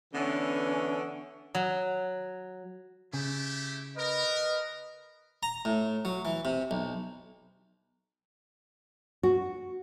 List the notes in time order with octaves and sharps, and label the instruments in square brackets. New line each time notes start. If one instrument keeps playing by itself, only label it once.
[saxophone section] D3 E3 B3 [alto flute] C#4
[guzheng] F#3
[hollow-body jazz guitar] C#3 [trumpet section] A3 E4 G4
[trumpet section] A#4 [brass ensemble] B4 D#5
[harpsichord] A#5
A2
F#3
E3
C3
B1
[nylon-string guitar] F#4